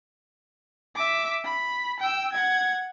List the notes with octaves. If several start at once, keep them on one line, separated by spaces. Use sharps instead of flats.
E5 D6
B5
G5 E6
F#5 G#6